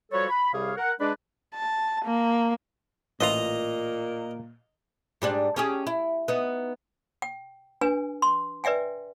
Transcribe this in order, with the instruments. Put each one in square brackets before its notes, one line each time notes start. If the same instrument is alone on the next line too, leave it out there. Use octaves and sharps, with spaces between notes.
[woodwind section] F3 G3 F#4 A4 B4 C#5
B5
C2 C3 G3 G#4 C#5 F5
A#4 F#5
G#3 D4 B4 D5
[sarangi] A5
A#3
[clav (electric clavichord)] A1 E3 F4 [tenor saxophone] A#2 [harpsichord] D#5 A#5
[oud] G#2 G3 D4
C#4 G4 G#4
E4
B3 D#4
[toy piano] G5
D4 B4 G#5
C6
B4 D5 E5 G5 G#5